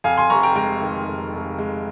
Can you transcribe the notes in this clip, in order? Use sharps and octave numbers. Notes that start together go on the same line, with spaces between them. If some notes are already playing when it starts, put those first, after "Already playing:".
F2 F5 G#5
G#5 C6
F1 A#5 C#6
G5 A#5
G#3 G5 A#5
D#3
F2
F1
G#3